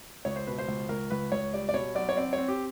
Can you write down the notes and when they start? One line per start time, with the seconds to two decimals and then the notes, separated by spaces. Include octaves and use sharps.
0.25 C#2 C#5
0.36 C5
0.47 B2 B4
0.59 C5
0.68 C#2
0.89 C#2 A#4
1.10 C#2 B4
1.32 C#2 C#5
1.54 G3 D5
1.69 D5
1.74 B2 C#5
1.95 B1 D5
2.09 C#5
2.17 C4 D5
2.33 C4 C#5
2.48 G4